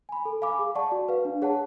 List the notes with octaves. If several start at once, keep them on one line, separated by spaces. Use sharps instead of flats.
G#5 B5
A4
F5 G#5 B5 D6
G#4
D5 F#5 A5 C#6
F#4
B4 F5
D4
G#4 C#5 F#5 A5